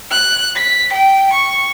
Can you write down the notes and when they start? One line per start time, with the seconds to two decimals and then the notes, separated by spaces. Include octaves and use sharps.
0.11 F#6
0.56 B6
0.93 G5
1.33 C#6